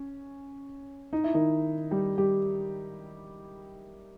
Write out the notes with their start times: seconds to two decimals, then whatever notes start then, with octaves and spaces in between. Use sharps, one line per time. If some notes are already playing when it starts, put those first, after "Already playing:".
Already playing: C#4
1.13 D#4
1.24 E4
1.34 D#3 D#4
1.91 G3 G4
2.18 G3 G4